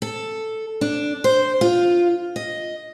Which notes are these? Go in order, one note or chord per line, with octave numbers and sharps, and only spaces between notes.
A4
D4
C5
F4
D#5